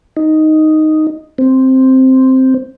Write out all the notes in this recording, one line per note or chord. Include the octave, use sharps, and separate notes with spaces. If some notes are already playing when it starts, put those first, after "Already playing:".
D#4
C4